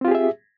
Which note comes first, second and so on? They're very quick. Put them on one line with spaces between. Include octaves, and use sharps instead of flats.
C4 F4 G4 G#4 E5